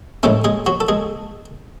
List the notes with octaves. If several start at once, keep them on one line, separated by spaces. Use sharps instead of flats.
A2 G#3 A3 C#4 A4
G#3 G#4
F#3 F#4
A4
G#3 G#4